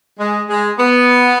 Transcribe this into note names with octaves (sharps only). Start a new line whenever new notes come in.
G#3
G#3
B3